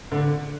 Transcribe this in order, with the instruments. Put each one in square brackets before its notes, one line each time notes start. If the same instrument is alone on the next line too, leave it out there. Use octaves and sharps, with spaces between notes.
[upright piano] D3